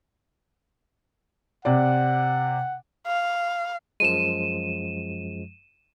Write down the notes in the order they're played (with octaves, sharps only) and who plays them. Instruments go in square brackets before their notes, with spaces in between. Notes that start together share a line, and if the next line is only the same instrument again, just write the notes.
[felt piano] C3 D5 [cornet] F#5
[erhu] F5
[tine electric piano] F#2 F3 G#3 [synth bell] D#7 E7